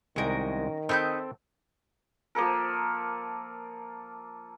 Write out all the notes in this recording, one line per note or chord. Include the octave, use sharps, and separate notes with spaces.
C2 D#3 G#3 C#4 A#4 G5
C4 D#4 A4 B4 G5 G6
F3 A#3 A4 A#4